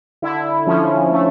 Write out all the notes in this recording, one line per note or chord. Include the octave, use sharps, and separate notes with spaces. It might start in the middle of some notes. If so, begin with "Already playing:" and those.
D3 E4
F3 C#4
A3